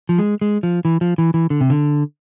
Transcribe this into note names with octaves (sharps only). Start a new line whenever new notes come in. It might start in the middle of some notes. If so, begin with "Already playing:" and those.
F3
G#3
G#3
F3
E3
F3
E3
E3
D3
C3
D3